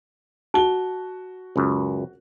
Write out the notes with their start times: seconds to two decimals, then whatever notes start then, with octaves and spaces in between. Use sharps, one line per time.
0.54 F#4 A5 G7
1.56 C#2 F#2